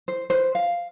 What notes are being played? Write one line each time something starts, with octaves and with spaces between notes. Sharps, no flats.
C5
B4 C5
F5